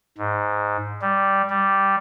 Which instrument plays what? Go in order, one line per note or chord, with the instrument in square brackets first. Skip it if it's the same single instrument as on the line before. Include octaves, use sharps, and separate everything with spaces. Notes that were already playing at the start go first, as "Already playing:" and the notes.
[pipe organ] G#2
G3
G3